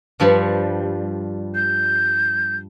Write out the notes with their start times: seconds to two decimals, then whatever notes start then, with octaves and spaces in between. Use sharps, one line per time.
0.20 G2 F3 G3
1.55 G6